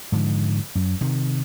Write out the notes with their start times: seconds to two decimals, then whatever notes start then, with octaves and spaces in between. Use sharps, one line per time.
0.12 G#2 D3 F3
0.75 F#2
1.01 C3 D#3